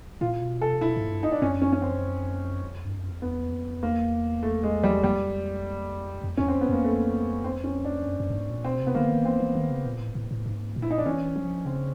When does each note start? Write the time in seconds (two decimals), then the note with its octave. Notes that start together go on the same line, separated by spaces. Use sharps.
0.21 A#2 F4
0.41 B2
0.61 C3 A4
0.81 B2 E4
0.97 G#2
1.11 G2
1.23 D#4
1.32 D4
1.42 F#2 C#4
1.62 C#4
1.73 C#4
1.82 C4
2.62 F2
2.85 G2
2.98 F#2
3.10 F2
3.22 E2 B3
3.52 F2
3.83 E2 A#3
4.43 A3
4.63 G#3
4.83 G3
5.03 F2 G3
6.24 F2
6.37 E2 C#4
6.48 C4
6.54 F2
6.61 B3
6.69 F2 A#3
6.84 A3
7.44 C4
7.64 C#4
7.84 D4
8.04 F#2
8.20 F#2
8.30 G2
8.35 G#2
8.50 A#2
8.64 B2 C4
8.80 C3
8.87 B3
8.95 D3 A#3
9.10 D#3
9.25 E3 C4
9.40 E3
9.55 D#3
9.70 C#3
9.85 A#2
10.00 A2
10.15 A2
10.31 A2
10.46 G#2
10.76 A#2
10.82 E4
10.90 D#4
10.98 D4
11.06 E3 C#4
11.36 F3
11.65 C#3 C4